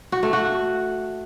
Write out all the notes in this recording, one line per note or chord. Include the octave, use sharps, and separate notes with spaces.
F#4
A3
F#4